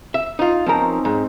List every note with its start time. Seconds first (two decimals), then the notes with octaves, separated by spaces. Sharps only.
0.14 E5
0.39 D#4 F4
0.66 F3 C4 C#4 D#4 A#4
1.05 G#2